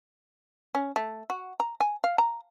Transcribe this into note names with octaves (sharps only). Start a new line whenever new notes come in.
C#4
A3
F#4
A#5
G#5
F5
A#5